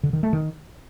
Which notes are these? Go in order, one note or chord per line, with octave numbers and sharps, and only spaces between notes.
D3
D#3
A3
D#3